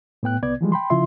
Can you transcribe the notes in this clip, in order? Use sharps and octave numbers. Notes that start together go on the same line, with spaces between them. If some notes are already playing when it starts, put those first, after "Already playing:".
A2 B3 G5 F#6
C2 B3 D5 G#6
E3 F3 G3 G#3
G5 B5 C6
C#3 F3 E4 F4 E5 C6